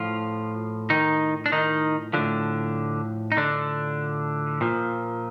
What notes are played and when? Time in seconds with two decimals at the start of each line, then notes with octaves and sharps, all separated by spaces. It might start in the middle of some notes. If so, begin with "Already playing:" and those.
Already playing: A2 F3 F4
0.90 D#3 D#4
1.46 D4
1.52 D#3 D#4
2.13 A2 D3 F3 D4
3.32 D#4
3.37 D3 D4
4.61 A#2 F3